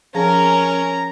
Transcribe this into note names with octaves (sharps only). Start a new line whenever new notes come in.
F3 C#4 G#4 A#4 A5 A#5